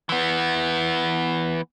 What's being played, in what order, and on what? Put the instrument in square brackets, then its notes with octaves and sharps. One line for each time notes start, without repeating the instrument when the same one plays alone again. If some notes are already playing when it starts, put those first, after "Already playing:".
[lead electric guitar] E3 B3